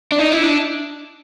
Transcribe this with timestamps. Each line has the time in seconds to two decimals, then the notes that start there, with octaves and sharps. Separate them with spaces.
0.12 D4
0.19 D#4
0.32 E4
0.43 D4